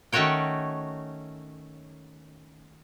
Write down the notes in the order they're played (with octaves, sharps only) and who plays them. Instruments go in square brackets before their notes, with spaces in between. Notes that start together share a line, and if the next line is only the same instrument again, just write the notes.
[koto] D#3 A3 C#4 F#4 C#5 G5